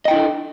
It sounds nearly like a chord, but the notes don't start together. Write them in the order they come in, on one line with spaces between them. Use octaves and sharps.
D#5 G5 E4 D4 A4